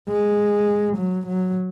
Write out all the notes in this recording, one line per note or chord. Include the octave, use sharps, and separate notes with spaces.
G#3
F#3
F#3